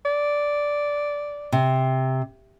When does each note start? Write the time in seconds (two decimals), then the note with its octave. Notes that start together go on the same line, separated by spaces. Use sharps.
0.05 D5
1.52 C3